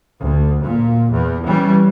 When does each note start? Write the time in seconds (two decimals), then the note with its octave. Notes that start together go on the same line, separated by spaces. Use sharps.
0.22 D2
0.66 A#2
1.14 E2
1.47 E3 G3 C#4